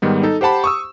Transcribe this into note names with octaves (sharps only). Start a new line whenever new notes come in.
G#2 D#3 G3 B3
D#4 A4
G4 C5 F#5 A5 B5
C#6 D#6 E6